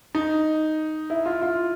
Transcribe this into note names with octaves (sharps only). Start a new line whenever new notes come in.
D#4
E4
F4
F4